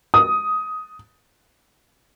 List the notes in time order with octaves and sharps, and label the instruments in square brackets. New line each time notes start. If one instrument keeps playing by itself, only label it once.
[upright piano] D#6